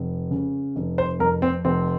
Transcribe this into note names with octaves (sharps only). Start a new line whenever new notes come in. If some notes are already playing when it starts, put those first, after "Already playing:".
Already playing: F1
C#3
F1
C5
F2 A#4
C4
F1 C4